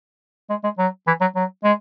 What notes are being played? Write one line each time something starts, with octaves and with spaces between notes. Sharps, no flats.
G#3
G#3
F#3
E3
F#3
F#3
G#3